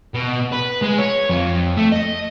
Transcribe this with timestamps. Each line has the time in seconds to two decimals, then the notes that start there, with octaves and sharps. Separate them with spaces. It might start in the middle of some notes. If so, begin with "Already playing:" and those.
0.14 B2
0.52 B4
0.82 G#3
0.98 C#5
1.29 F2
1.77 A3
1.92 D#5